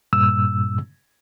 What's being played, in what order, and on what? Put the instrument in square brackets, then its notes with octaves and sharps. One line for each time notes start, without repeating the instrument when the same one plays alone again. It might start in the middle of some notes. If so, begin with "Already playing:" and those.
[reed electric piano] G2 A#2 E6